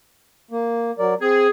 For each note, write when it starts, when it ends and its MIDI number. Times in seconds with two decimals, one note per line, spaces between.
0.51 0.91 58
0.99 1.14 54
0.99 1.14 70
0.99 1.14 74
1.21 1.47 60
1.21 1.50 68